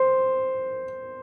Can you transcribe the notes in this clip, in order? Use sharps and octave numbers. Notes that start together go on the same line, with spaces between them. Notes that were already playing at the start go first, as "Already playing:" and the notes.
Already playing: C5